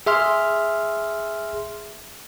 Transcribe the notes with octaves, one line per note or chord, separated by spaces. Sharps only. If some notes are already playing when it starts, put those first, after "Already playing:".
G#4 E5 C6 F6